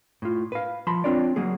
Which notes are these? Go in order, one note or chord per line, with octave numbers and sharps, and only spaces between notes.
A2 F4
B4 F5
F3 A5 B5 C6
C4 D4 F4 C#5 D5
F#3 A#3 G#4